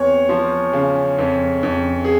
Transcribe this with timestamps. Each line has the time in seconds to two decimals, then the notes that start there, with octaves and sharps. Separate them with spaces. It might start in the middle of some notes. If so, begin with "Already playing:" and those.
Already playing: E2 C4 C#5
0.29 F3
0.73 C#3
1.18 F2
1.63 F2
2.04 G#4